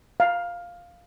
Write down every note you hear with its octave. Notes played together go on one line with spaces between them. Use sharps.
F5